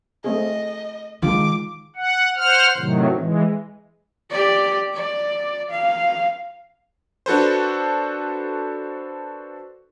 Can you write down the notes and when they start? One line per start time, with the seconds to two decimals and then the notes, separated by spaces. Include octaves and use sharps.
0.24 A3 C4 G#4 D#5
1.22 D#3 G#3 F4 D6
1.96 F#5
2.36 C5 F#5 F6
2.77 A2 C3 D#3 F#3
3.16 E3 G#3
4.31 G4 D5
4.94 D5
5.71 F5
7.26 D4 F#4 A4 B4 C5